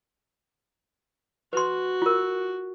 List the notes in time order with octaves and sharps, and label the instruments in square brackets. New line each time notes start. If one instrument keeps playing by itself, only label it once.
[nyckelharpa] F#4 [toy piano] B4 C6
[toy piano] F4 A#4